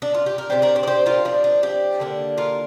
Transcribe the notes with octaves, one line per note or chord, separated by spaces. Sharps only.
D4
F4
G4
A#4
C3 A#3 D4 G4 C5
A#4 D5
G4 C5
D5
G4 C5
F4 A#4
F3 C4 D4
D4
D4 G4
D3 A#3 D4
F4 A#4